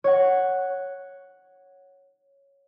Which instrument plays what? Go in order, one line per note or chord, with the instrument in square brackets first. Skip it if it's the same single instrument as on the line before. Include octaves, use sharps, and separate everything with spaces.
[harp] C#5 F#5